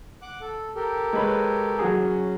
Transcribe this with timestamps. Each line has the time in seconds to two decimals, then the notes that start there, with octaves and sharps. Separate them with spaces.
0.22 F#5 D6 F#6
0.41 A4
0.75 G4 A4 A#4
1.13 G#3 B4 C#5
1.79 F#3 F#4 G#4
2.00 C#4